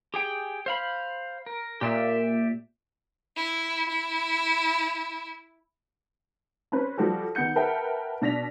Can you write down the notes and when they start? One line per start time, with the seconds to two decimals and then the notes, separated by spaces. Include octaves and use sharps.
0.14 G4 G#4 G5
0.66 C5 F5 B5
1.46 A#4
1.81 A#2 G4 D5 E5
3.37 E4
3.89 E4
6.72 C4 C#4 B4 C5
6.98 F3 G3 F#4 G4 A4
7.35 D#3 B3 F#5 G6 C#7
7.56 A#4 B4 E5 F#5 G5 A5
8.22 B2 D4 A#6 B6 F7